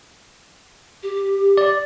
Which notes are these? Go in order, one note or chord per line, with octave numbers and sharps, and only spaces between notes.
G4
D5